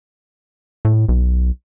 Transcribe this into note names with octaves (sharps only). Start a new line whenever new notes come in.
A2
B1